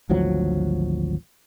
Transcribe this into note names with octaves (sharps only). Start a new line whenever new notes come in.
G#1 D2 F3 F#3